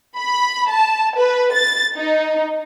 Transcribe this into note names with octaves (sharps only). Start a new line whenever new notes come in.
B5
A5
B4
A6
D#4